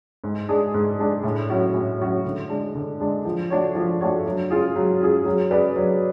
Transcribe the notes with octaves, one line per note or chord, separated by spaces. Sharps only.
G#2
G#3 D4 G#4
G#2
G#3 D4 G#4
A2
F#3 C#4 F#4
A2
F#3 C#4 F#4
D3
G#3 D4
D3
G#3 D4
F3
A3 D4 F#4 C#5
F3
A3 D4 F#4 C#5
F#3
C#4 F4 G#4
F#3
C#4 F4 G#4
F#3
C#4 G#4 B4 D5
F#3